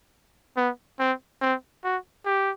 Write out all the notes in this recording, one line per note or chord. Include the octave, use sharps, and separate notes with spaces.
B3
C4
C4
F#4
G4